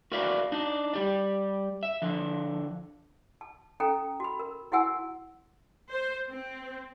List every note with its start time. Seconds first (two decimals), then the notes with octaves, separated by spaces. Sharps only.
0.12 F#4 A#4 B4 D5 E5 F5
0.52 D4 D#4
0.93 G3 G4 D5
1.83 E5
2.02 D3 F3
3.41 A5
3.80 C#4 A4 G5 A#5
4.20 F#4 B5
4.39 A#4
4.72 E4 F#4 C5 F#5 G#5 E6
5.91 C5
6.31 C4